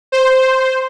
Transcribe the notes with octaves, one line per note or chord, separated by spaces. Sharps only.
C5